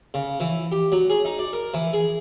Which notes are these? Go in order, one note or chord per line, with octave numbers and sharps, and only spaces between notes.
C#3
E3
G4
F#3
G#4
D#4
D5
A#4
E3
G#4